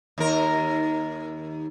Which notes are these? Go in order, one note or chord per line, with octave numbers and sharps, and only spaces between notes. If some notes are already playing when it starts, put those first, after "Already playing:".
D#2 A#4